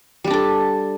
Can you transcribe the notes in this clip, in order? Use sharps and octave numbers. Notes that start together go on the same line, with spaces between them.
G3 D4 G4 A4